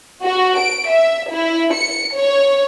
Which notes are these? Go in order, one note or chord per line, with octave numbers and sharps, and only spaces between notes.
F#4
D7
E5
E4
C#7
C#5